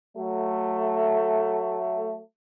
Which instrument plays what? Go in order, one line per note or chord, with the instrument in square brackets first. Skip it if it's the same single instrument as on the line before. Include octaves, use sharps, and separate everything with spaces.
[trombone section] F#3 A3